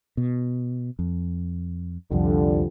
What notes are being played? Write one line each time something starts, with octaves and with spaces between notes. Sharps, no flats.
B2
F2
C2 F2 D3 F3 G3